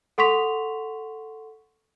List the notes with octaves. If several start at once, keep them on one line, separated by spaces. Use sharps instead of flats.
A4 F#5 C6 C#6 B6 F7